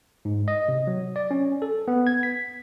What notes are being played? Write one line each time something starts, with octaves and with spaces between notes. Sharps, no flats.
G#2
D#5
C3
F#3
D5
C#4
A4
B3
G#6
B6